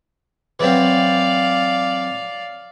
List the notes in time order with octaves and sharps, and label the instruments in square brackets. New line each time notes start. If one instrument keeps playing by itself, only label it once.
[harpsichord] E3 F#3 C4 [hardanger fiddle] D5 F5